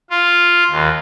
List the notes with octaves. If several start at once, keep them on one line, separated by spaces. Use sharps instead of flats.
F4
D#2